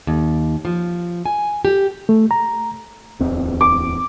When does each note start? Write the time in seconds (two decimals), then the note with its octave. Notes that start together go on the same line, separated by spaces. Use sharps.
0.07 D#2
0.65 F3
1.26 G#5
1.65 G4
2.09 A3
2.31 A#5
3.19 D1 E2 C4
3.61 D6